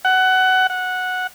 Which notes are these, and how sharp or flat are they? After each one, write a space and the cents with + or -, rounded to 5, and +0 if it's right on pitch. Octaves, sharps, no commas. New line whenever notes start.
F#5 +15
F#5 -10